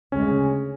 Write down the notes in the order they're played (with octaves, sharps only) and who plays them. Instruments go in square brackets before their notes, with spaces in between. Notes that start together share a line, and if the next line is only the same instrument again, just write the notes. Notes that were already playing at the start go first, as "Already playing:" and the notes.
[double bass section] D2 C#3 G#3 [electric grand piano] C#4